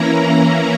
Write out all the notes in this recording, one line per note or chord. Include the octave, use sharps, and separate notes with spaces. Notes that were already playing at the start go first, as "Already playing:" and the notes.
Already playing: E3 A#3 C#4 E4 A#5